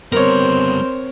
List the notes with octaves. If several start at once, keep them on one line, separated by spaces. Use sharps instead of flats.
G3 B3 C4 A#4 C5 C#5